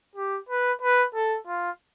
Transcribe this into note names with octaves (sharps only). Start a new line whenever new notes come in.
G4
B4
B4
A4
F4